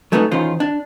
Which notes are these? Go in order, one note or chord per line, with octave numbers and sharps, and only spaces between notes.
F#3 A3 B3 C#4 D#4
E2 D#3 C#4 F4 C5
D4